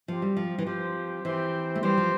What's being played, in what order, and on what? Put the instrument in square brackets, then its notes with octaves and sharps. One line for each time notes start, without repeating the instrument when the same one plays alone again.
[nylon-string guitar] F3 [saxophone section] C4 G4 C5
[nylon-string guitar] G3
F3
E3
[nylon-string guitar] F3 [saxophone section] C4 G4 C5
[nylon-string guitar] E3 [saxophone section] C4 G4 C5
[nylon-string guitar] A3
[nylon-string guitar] E3 G3 [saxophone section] C4 G4 C5
[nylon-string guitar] F3